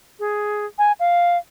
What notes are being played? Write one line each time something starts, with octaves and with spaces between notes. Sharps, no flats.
G#4
G#5
F5